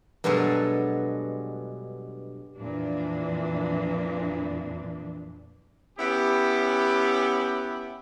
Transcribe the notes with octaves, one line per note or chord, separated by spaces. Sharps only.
G2 B2 F#3 G#3 A4
F2 A#2 E3 D4
B3 C#4 E4 G4